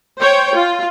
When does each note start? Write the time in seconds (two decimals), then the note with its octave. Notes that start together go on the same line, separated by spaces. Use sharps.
0.19 C5 C#5 G5
0.54 F4